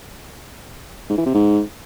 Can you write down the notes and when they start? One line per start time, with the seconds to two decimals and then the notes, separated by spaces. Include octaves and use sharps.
1.09 G#2
1.18 E3
1.26 C3
1.34 G#2